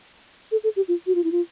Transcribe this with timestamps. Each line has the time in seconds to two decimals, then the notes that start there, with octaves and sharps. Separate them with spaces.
0.52 A4
0.64 A4
0.76 G4
0.88 F4
1.07 F#4
1.15 F4
1.24 E4
1.32 F4